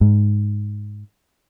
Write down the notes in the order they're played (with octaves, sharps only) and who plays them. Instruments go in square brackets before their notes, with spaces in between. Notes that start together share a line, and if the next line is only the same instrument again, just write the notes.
[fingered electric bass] G#2